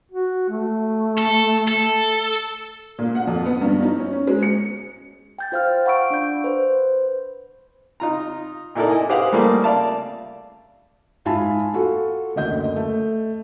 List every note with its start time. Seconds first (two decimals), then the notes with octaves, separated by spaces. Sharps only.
0.12 F#4
0.49 A3
1.18 A4
1.67 A4
2.99 A#2
3.15 F#5
3.27 F2
3.46 B3
3.62 G2
3.82 D#4
3.99 C#4
4.13 C#4
4.27 G#3
4.43 C#7
5.39 G5 G6 A6
5.52 F4 C5 F5 G5 F6
5.85 F5 F#5 B5 C#6 E6 D7
6.10 D4 D5 G6
6.44 B4 C5
8.00 D#4 F4 A#5
8.75 A#2 D#4 E4 A4 A#4 D5
8.89 D#5 G#5
9.09 G4 G#4 B4 C5 F5 F#5
9.33 G3 A3 A#3 F4 G#4
9.64 D5 E5 F5 A5
11.25 G#2 F4 E5 G#5 A5 B5
11.74 F4 F#4 A4
12.36 F#1 D2 D#5 G6
12.76 A3